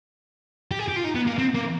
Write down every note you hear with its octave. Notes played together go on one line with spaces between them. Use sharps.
G4
G#4
G4
F4
D#4
B3
A#3
C4
A#3